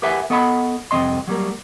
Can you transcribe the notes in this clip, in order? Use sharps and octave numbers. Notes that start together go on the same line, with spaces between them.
G4 A#4 B4 E5 F#5 G#5
B3 A4 D#5 F#5 G#5 B5
C2 F2 C#3 C4 D#5 C6
F#3 G3 A#3 A#4